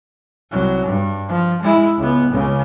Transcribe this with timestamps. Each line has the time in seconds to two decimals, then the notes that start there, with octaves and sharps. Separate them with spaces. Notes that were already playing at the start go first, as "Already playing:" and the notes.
0.51 C2 F#3
0.86 G2
1.29 F3
1.62 G#3 E4
1.98 C#2 B3
2.30 C#2 C#3